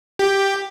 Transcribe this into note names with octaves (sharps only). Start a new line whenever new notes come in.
G4